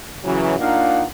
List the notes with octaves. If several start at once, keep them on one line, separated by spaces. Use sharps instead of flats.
C#3 E3 F#3
A#3 D4 D#4 F4 F5 F#5